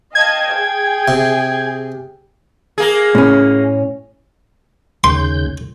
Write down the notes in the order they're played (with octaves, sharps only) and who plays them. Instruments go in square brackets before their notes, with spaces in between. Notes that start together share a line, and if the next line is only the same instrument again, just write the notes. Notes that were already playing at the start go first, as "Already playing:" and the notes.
[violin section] D#5 F5 A5 [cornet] G5 [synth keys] G#6
[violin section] G#4
[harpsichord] C3
[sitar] A#3 G#4
[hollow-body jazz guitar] A2 C#4
[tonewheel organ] D#2 C#3 G6 [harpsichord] C6